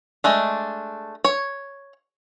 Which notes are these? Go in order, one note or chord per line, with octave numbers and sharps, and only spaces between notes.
G#3 A3 D4
C#5